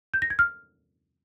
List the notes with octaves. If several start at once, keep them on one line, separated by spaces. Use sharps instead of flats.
G6
A#6
G#6
F6